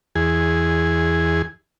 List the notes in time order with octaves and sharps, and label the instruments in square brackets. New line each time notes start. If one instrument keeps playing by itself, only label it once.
[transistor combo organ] E2 G#4